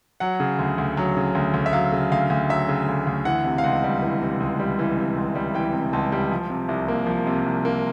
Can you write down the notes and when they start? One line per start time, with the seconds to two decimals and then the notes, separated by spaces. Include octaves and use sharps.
0.20 F#3 F#5
0.40 C#3
0.59 D2
0.78 D2
0.97 F#3
1.17 C#3
1.35 D2
1.54 D2
1.66 E5
1.73 F#3 F5
1.92 C#3
2.12 D2 F5
2.30 D2
2.49 F#3 E5
2.68 C#3
2.88 D2
3.07 D2
3.25 E3 F#5
3.45 C3
3.58 F5
3.64 C#2 F#5
3.84 G3
4.02 E3
4.21 C3
4.40 C#2
4.60 G3
4.79 E3
4.97 C3
5.17 C#2
5.35 G3
5.54 E3 G5
5.73 C3
5.93 C#2 A5
6.12 G3
6.31 F3
6.50 C3
6.69 C2
6.88 A#3
7.07 F3
7.27 C3
7.46 C2
7.65 A#3